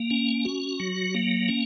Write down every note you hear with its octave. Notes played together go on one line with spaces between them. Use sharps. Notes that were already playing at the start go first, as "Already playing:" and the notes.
Already playing: A#3
C#4
F#4
F#3
A#3
C#4